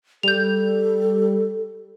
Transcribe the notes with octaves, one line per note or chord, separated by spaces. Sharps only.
G3 A4 G6 F7